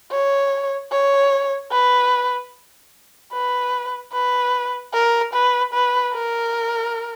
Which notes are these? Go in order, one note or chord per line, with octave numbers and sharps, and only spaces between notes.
C#5
C#5
B4
B4
B4
A#4
B4
B4
A#4